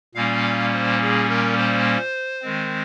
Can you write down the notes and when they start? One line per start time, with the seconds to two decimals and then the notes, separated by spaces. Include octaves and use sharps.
0.15 A#2 G3 A#3 C#4 F5
0.73 C5
1.01 G#4
1.29 A#4
1.57 C5
2.42 D#3 G#3 C4